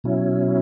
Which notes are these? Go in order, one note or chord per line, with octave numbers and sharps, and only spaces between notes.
B2 F#3 C#4 E4